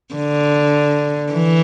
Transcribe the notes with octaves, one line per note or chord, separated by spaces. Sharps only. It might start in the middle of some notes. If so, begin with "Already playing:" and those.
D3
E3